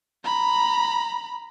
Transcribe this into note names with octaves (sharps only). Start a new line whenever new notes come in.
A#5 B5